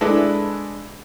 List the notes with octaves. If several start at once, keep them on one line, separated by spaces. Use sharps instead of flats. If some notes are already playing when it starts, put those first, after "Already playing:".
G#3 D4 E4 A4 B4